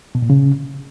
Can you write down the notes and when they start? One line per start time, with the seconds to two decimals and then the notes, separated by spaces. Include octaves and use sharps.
0.15 B2
0.22 A#2
0.30 C#3